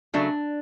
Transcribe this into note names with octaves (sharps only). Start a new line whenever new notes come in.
C#3 F#3 A3 D4